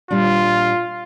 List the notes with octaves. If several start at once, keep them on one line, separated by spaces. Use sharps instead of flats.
A#2 G3 D4 F4